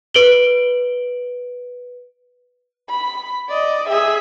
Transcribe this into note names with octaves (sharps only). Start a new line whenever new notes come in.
B4 D7 F#7 G7
B5
D5 D#5
G#4 E5